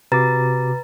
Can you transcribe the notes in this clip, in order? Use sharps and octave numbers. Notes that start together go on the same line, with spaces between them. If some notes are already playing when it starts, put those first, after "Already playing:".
C3 F#4 B4 A#5 D6 A6